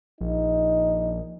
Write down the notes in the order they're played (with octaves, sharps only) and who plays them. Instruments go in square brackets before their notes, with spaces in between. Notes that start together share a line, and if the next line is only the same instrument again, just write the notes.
[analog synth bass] A#1 [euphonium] D#4